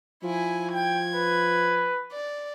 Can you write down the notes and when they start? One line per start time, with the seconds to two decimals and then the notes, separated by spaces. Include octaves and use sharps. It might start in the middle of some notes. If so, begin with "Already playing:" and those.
0.23 F3 E4 G#5
0.73 G5 G#6
1.16 B4
2.12 D5